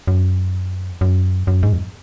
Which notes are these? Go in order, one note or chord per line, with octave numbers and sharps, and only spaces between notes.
F#2
F2
F#2
F#2
G#2
F2